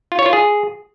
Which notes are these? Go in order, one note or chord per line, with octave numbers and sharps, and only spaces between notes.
F4
C#5
F4
G#4